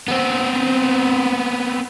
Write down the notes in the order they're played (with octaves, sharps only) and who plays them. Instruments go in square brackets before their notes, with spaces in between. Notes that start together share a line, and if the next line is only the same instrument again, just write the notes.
[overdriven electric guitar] B3 C4